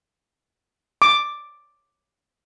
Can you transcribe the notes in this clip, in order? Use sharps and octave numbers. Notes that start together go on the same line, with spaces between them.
D6